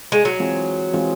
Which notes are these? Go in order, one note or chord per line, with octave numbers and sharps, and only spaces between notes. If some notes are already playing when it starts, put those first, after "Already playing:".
G#3
F#3
E3 G#3 C4 F4 G#4
E3 G#3 C4 F4 G#4